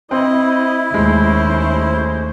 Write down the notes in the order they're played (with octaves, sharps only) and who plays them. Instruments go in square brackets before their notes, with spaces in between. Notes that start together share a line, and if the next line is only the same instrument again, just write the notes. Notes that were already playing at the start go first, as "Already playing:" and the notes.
[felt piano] C4 [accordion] E4 [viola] D#5
[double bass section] D#2 A3 [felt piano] G#3 [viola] C#4 C5